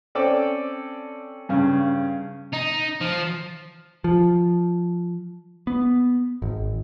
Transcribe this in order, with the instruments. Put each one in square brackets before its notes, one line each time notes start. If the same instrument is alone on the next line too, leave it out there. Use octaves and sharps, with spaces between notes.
[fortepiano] C4 C#4 A4 D5 G5
G2 C#3
[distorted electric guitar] D#4
F3
[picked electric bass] F3
B3
G#1